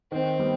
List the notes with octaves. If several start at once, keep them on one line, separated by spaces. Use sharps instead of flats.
D#3 C4
G3 B3